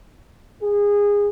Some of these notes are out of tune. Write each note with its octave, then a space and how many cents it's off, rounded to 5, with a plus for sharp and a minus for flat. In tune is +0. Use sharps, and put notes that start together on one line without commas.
G#4 -20